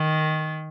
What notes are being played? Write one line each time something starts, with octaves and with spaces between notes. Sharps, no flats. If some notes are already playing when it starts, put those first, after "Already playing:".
Already playing: D#3